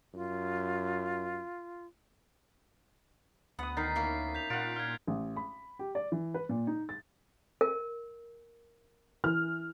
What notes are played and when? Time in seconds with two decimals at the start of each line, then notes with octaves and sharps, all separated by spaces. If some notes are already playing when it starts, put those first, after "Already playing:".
0.14 F#2 F4
3.59 D2 B3 F#5 D#6
3.77 D#3 D#4 F5 A6 B6 C7
3.95 A#3 C#4 E4
4.35 G6 B6 F7
4.50 A#2 F4 F#5 D7
4.76 F6 G#6
5.07 A1
5.36 B5
5.79 G4
5.95 D5
6.12 E3
6.34 B4
6.49 A#2
6.67 D#4
6.89 A6
7.61 A#4
9.24 E3 F6